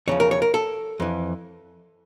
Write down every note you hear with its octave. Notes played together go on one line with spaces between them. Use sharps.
E2 C#3 F3 C#5
A#4
C#5
A#4
A4
F2 E3